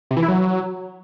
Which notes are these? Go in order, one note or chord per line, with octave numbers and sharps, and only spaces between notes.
C3
E3
E4
F#3